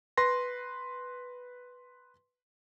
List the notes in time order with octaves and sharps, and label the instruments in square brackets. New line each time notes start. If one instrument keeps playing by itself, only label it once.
[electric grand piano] B4 C6 A#6